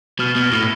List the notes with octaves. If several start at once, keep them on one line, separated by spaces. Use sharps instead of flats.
B2 F6
B2
F6
A2